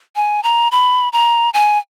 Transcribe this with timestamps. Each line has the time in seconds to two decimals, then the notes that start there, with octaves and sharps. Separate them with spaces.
0.16 G#5
0.43 A#5
0.71 B5
1.13 A#5
1.54 G#5